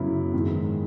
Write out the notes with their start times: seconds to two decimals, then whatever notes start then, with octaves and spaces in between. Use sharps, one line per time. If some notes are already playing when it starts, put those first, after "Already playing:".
Already playing: F#2 C#3 F#3 B3 E4
0.33 G#2 D#3 G#3